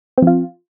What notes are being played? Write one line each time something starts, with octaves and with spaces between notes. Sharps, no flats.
F3 C4 F4